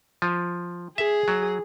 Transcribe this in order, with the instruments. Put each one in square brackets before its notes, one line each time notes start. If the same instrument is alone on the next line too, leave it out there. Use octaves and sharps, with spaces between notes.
[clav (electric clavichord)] F3
[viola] G#4 [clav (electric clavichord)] E5
[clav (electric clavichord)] F#3